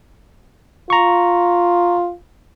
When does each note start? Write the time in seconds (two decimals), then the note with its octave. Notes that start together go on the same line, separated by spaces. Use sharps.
0.90 F4 A#5 C#6